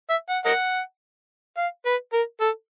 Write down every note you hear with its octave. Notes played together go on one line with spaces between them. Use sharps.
E5
F#5
A#4 D#5 F#5
F5
B4
A#4
A4